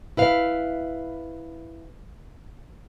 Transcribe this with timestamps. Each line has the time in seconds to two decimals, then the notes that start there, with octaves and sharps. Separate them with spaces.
0.17 E4 B4 F5